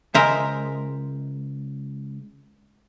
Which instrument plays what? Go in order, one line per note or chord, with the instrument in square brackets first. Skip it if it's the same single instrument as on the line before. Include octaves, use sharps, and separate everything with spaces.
[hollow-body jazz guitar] C#2 E5 [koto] G#3 A#4 C5